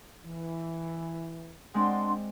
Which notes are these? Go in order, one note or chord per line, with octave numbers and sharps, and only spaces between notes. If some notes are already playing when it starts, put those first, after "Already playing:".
E3
G#3 C4 D4 D5 F#5 C6